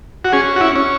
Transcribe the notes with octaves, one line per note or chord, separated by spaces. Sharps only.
F#4
C#4 G#4
F#4
E4
C#4